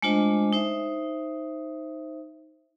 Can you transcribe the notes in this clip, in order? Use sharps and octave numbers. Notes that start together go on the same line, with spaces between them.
G#3 A3 D4 F4 C5 D#5
D#4 C5 E5